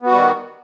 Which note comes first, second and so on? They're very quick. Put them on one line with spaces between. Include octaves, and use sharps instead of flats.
B3 F#4 G3 D#3